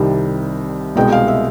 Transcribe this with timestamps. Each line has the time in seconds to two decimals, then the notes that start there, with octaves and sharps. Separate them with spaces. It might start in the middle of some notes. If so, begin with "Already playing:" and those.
Already playing: C2 C3 D#3 G3
0.96 C2 B2 G#3 G5
1.12 F5
1.28 E5